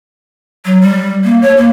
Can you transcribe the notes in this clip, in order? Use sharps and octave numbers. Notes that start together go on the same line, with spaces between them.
F#3
G3
A#3
C#5
A#3